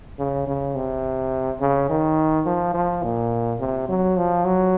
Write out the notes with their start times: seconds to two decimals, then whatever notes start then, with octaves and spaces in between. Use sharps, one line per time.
0.19 C#3
0.47 C#3
0.76 C3
1.60 C#3
1.89 D#3
2.46 F3
2.74 F3
3.03 A#2
3.60 C3
3.89 F#3
4.17 F3
4.45 F#3